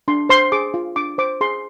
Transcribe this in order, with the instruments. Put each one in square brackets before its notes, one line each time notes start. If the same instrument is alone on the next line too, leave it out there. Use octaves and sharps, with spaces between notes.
[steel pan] D4 C6
C5 C6
G#4 D6
F4
D4 D6
C5 D6
G#4 C6